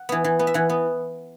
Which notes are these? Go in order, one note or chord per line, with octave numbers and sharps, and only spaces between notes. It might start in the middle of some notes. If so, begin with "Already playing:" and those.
Already playing: F#5
E3 B3
E3
B3
E5
E3 F#5
B3